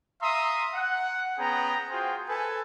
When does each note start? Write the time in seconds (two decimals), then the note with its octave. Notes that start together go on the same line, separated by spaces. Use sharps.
0.21 E5 F5 A#5 C6 D#6
0.75 F#5
1.38 B3 C#4 G#4 G5 A#5
1.90 F4 F#4 G#4 C5 G5
2.29 A4 B4 G#5